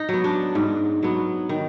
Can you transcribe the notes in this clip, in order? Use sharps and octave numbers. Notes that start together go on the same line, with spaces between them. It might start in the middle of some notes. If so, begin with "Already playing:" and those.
Already playing: D#4
F#3 B3
D4
G#2
F#3 B3
D#3